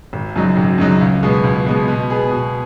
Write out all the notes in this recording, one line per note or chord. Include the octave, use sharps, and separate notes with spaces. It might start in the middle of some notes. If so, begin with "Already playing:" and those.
G#1
F#2 C#3 F#3 D#4
G#1
F#2 C#3 F#3 D#4
C#2
B2 G#3 B3
C#2
B2 G#3 B3
B2
B3 G#4
B2